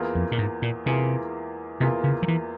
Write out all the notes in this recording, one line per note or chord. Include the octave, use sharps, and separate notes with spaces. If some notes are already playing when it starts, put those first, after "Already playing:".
Already playing: E2 E3 A#3 F4 G#4
F2
A#2
G#2
A#2
E2 C3 E3 A#3 F4 G#4
E2 C3 E3 A#3 F4 G#4
C#3
F3
E3